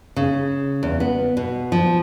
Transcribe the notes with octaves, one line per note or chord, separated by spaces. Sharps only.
C#3
E2
B3
B2
F3